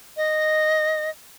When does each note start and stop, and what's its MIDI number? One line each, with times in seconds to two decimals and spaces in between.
0.17 1.10 75